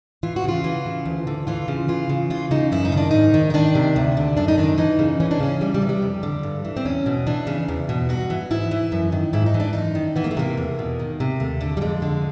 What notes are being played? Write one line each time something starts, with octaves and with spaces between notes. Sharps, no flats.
E3 F4
F#4
C#3 F4
E3
C#3
D2
D3
E3 F4
C#3
E3 F4
C#3
E3 F4
C#3 D#4
F#2 E4
D#4
D#3
D4
G#2 D#4
D#3
D#4
D#3 D4
C3
D2
D3
F#2 D4
D#4
D#3 D4
E3 D#4
C#3
E3 C#4
D4
C#3 C#4
E3 G3
G3
C3
G3
F2
D3
G2
E3
C4
E2 C#4
B2
E3 D4
C#3
E2
B2
G2 F#4
E3
G#2 E4
E3
F#2
D#3
G#2 E4
D#4
E3
D4
F#2 D#4
D#3
E3 B3
A#3
A3
C3 A#3
E2
B2
D#3
C3
D#2 A3
D3
G3
F2 G#3
D3